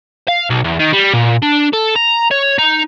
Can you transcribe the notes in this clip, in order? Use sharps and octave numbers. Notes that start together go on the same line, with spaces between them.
F5
B1
E2
D#3
G3
A#2
D4
A4
A#5
C#5
D#4